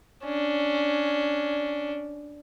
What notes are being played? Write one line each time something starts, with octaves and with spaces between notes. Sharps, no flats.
C#4 D4